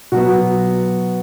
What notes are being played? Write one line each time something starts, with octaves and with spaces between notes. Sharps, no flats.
B2 F#3 B3 F#4